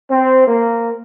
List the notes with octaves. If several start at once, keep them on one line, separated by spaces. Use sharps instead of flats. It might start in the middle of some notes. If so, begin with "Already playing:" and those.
C4
A#3